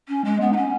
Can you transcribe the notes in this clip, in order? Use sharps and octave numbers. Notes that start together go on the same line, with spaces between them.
C#4
G#3
B3
D#4
C#4